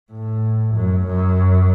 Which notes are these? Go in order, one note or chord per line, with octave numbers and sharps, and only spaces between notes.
A2
F#2
F#2